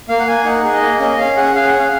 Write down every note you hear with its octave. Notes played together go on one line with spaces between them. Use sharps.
A#3 F5
F#5
A#3 G#5
D#4 F#5
G#4
D#5
A#3
C#4 D#5
C#4 F5
G#4 F#5
G#4 F5
F#5
C#4 F5